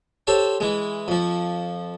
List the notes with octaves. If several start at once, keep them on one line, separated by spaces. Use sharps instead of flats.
G4 A4 C5 C#5
E3 G#3
F2 F3